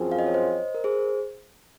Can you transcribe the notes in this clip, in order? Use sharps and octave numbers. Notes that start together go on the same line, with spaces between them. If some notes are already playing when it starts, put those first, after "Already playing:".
Already playing: F#2 F3 C4 F4 G#4
F5
D#5
C#5
C5 D#5
A#4
G#4 C5